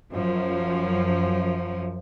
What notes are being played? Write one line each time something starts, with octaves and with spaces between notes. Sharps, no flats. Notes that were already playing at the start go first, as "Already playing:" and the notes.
F#2 F3